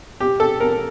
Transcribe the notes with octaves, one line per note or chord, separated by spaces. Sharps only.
G4
A4
A#4